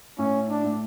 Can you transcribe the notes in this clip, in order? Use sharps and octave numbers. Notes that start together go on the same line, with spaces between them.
A2 C#4
D4
A2